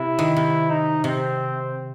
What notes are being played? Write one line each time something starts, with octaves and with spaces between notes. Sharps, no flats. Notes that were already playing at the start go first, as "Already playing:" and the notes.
Already playing: C3 E4
D#3
C3
D#4
C3 C4